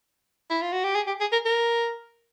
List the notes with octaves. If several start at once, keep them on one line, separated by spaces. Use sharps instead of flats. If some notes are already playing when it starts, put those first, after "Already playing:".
E4
F4
F#4
G4
G#4
G4
G#4
A#4
A#4